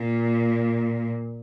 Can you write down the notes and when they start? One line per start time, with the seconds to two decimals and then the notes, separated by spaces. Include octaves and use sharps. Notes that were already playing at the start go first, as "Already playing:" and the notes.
Already playing: A#2